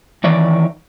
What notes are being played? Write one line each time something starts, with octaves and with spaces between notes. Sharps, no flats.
D#3 E3 C#5 D5